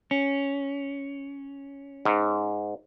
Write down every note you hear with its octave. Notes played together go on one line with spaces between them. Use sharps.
C#4
G#2